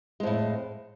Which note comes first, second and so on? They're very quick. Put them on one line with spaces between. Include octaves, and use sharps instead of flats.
G#3 F2 A2